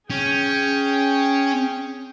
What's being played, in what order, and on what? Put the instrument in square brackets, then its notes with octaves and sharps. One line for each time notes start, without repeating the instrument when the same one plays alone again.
[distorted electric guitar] C#4 [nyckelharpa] G#4 G5